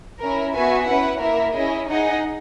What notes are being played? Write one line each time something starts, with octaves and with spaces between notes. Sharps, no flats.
C#4 E4 A#4
B3 F#4 B4 E5 G#5
C#4 E4 B4 F#5
A#3 E4 A#4 E5
C#4 E4 G#4 D#5
D#4 G#4 D#5 F#5